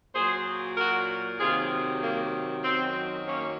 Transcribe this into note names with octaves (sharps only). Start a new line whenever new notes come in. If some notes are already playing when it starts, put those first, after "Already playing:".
A#2 F#3 G#4 C5
F#4 A#4
C3 D#3 F#3 F4 G#4
A#3
F#2 D#3 F#3 C4
A#3 C#4